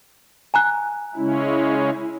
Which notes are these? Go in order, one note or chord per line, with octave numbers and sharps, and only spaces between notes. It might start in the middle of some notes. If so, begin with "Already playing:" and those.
G#5 A#5 F#6
C#3 G#3 C#4 E4